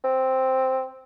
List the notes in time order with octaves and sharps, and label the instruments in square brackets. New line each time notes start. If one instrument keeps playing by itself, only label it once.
[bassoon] C4